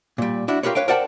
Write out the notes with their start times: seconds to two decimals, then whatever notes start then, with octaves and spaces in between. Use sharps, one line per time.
0.18 A#2 G3
0.48 D4 E4 F#4
0.63 F4 G4 A#4 B4 C#5
0.75 B4 C#5 F5 G5
0.88 A#4 C5 D5 F#5 G5 A5